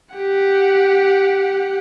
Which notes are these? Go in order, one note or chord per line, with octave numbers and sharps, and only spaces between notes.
G4 F#5